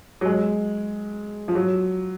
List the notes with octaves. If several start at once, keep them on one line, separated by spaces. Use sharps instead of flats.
F#3
G#3
F3
F#3